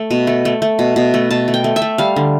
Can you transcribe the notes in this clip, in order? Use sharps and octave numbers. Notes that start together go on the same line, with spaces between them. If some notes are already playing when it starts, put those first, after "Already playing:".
Already playing: A3
B2
A3
A3
A3
B2
B2
A3
B2 A5
A3
G5
A3
E5
A3
G3 F5
D3